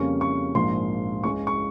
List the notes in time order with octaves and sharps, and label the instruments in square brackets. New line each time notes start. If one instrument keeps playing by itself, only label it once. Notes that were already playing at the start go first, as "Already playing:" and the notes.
Already playing: [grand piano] F2 C#3 G3 A#3 C#4 C#6
C#6
A#1 G#2 F3 A#3 C6
C#2 C#3 G#3 C#4 C#6
C#6